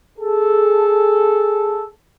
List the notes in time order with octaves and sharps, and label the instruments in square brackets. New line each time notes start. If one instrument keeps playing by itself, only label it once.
[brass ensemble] G#4 A4